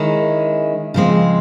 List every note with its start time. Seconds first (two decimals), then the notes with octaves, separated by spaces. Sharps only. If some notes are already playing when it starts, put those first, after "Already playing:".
Already playing: D#3 G#3 C#4 E4
0.94 C#3 F3 G#3 C4